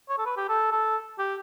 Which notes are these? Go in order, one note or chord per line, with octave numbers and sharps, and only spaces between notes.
C#5
A4
B4
G4
A4
A4
G4